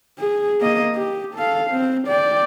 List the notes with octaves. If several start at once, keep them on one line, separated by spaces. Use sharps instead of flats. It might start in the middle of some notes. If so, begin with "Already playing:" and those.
G#4
A#3 D#5
G4
A4 F5
C4
D5 G5